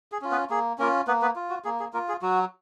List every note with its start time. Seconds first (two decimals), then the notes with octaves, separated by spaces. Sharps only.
0.12 G#4
0.21 C#4 F4
0.31 B3 B4
0.50 A#3 G#4
0.78 A#3 C#4 F4 A#4
1.07 A#3 B3 B4
1.22 B3 B4
1.36 F4
1.50 F#4
1.65 A#3 G#4
1.80 G#4
1.93 A#3 F4 A#4
2.08 G#4
2.22 F#3 F#4